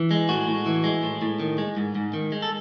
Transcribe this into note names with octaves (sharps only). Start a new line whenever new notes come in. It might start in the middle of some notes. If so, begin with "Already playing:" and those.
Already playing: E3
G#3
A2 F#4
A2
E3
G#3
A2
A2
D#3
G#3
G#2
G#2
D#3
G#3
A4